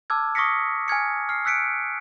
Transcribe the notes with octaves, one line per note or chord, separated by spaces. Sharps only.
A5 D6 E6 F6 G#6
C#6 D#6 F6 A#6 B6 C#7
G#5 F6 G#6 C#7
F6 C7
E6 F#6 B6 C#7 D7